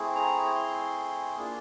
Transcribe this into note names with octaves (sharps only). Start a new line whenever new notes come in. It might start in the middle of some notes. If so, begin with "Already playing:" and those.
Already playing: A3 C4 E4 G#4
A#5
C6
A#3 D4 F4 G#4